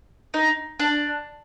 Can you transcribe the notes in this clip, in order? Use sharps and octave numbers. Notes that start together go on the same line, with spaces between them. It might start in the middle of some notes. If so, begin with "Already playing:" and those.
D#4
D4